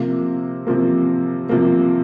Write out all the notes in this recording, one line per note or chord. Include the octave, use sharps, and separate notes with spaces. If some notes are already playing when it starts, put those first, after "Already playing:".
Already playing: C3 F3 A#3
C3 F3 A#3
C3 F3 A#3